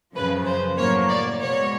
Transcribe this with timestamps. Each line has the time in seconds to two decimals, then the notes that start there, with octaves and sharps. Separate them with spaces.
0.16 F#2 C#3 F3 B4
0.46 C5
0.77 A2 F#3 A#3 C#5
1.09 D5
1.40 B2 G#3 C#5